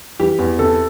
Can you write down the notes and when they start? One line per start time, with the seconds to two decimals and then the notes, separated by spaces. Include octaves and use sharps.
0.20 E3 G4
0.39 E2
0.59 C3 A4